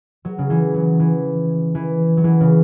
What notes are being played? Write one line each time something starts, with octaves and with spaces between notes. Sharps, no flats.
F#3
C#3
E3
F#3
E3
E3
F#3
E3
C#3